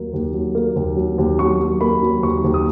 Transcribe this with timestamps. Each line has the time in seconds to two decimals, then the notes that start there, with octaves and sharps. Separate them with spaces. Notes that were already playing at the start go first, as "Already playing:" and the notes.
Already playing: D#2 F#3 A#3
0.13 D#2
0.34 F#3
0.55 A#3
0.76 D#2
0.96 F#3
1.18 D#2
1.39 F#3 C#6
1.60 F#3
1.81 A#3 B5
2.03 F#3
2.23 D#2 C#6
2.44 D#2
2.54 D#6